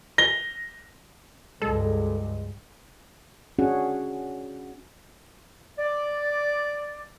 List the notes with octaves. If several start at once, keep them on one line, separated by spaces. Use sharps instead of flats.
A#6 G7
C#2 G2 G#3 A4
C#4 D4 F#4 G#4 F#5
D5